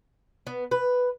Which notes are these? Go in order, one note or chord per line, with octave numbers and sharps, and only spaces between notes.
B3
B4